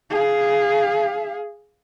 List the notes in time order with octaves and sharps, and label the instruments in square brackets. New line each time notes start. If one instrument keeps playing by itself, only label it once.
[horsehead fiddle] G#4 F5